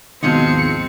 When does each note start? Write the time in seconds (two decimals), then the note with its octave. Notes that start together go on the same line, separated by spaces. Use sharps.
0.23 D#2 G#2 B2 F3 G#3 C4 D#4 C#7